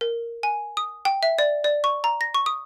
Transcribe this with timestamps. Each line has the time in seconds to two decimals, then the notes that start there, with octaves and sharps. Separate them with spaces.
0.01 A#4
0.43 G#5
0.77 D#6
1.05 G5
1.23 E5
1.39 D5
1.64 D5
1.84 C#6
2.04 A#5
2.21 A#6
2.34 C#6
2.46 D#6